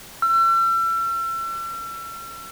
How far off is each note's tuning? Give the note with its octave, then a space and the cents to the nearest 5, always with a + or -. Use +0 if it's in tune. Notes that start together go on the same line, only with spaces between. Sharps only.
E6 +40